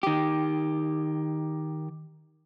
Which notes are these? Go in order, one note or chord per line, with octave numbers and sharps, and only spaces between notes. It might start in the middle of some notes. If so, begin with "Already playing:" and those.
D#3 G4